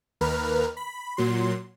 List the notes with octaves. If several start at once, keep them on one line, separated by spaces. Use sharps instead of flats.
D#2 A#4 B4 F6
B5
A#2 F#3 C6